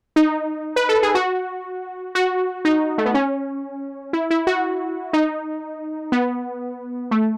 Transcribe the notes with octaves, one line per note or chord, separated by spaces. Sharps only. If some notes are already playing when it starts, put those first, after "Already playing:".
D#4
B4
A4
G#4
F#4
F#4
D#4
A3
B3
C#4
E4
E4
F#4
D#4
B3
A3